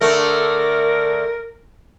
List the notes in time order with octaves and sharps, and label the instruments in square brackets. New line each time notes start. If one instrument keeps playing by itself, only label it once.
[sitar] D3 A3 [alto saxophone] A#4